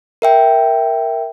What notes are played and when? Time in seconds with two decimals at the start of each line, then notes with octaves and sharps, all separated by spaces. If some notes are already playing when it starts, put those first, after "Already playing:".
0.22 A#4 E5 G5